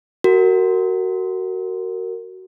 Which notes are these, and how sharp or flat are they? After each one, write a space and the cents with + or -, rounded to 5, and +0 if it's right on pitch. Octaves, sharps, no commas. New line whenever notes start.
F#4 +20 A#4 -20